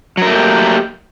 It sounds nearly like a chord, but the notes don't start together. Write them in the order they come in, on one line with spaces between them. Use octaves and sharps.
F#3 A#4 A3 A#3 G4